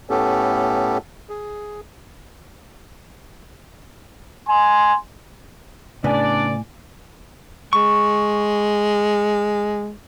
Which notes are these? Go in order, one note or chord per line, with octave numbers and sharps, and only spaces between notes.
A2 A3 B3 C#4 G4 A4
G#4
G#5 C6
A2 C#3 B3 D4 D5 G#5
G#3 C#6